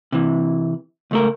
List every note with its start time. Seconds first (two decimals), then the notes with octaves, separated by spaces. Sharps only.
0.12 C3 E3
1.11 C#2 A3 A#4